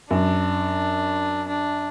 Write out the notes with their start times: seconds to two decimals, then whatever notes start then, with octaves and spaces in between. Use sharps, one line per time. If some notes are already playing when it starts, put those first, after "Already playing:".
0.11 F#2 D4
1.48 D4